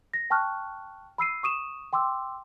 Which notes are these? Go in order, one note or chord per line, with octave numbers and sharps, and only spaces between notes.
A#6
G5 A5 C#6 F6 F#6
B5 E6 C7 D#7
C#6 D#6 D#7 E7
G5 C6 D6 E6